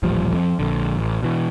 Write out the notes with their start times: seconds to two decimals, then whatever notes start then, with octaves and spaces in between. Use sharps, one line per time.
0.03 D#1 A1 F3 G3
0.34 F2
0.59 A#1 D3
0.97 A1
1.23 B2 E3